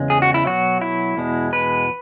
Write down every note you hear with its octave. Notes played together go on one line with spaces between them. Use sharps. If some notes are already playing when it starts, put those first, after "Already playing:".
Already playing: E2 C#3 G#3
G#4
F#4
E4
B2 F#3 F#4
E4
E2 B2 G#3
B4